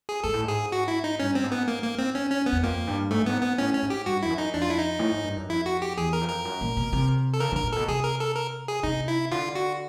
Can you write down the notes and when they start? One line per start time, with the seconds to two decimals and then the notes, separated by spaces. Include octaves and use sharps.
0.09 G#4
0.23 G#2 A4
0.34 A2
0.43 G#2 G#4
0.72 F#4
0.88 E4
1.04 D#4
1.20 G2 C#4
1.35 C4
1.44 G#2
1.52 B3
1.68 A#3
1.83 A#3
1.99 C4
2.15 C#4
2.31 C#4
2.46 B3
2.52 E2
2.63 F2 A#3
2.87 G2
3.11 G#2 A3
3.19 G2
3.26 G#2 B3
3.42 B3
3.58 A2 C#4
3.74 C#4
3.82 G#2
3.90 G4
4.06 G2 F#4
4.23 F2 E4
4.30 F#2
4.38 D#4
4.54 F2 D4
4.62 F4
4.70 E4
4.78 D#4
4.99 A2
5.11 G#2
5.24 G2
5.36 F#2
5.49 F2 E4
5.66 F#4
5.82 G4
5.97 E2 G#4
6.13 A#4
6.21 F2
6.29 A#4
6.45 F#2
6.61 A#2
6.77 B2
6.93 C3
7.33 A4
7.40 C#3 A#4
7.52 D3 A#4
7.64 A#2
7.73 B2 A4
7.88 C3 G#4
8.04 A#4
8.20 A4
8.36 A#4
8.68 G#4
8.83 C3 D#4
9.08 E4
9.31 D3 F4
9.55 F#4